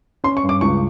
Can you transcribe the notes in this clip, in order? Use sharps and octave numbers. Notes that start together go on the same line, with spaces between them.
C#4 C6
C#6
G2
D6
C#2 C#6